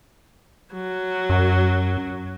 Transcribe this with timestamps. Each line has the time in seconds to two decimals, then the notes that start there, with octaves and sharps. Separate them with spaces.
0.73 F#3
1.30 F#2